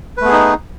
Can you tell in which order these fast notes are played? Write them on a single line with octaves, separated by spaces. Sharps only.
B4 A3 B3 G#4 D#4